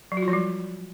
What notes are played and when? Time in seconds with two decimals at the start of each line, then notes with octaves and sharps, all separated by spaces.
0.12 F#3
0.17 F#4
0.22 F4
0.28 F3
0.33 G3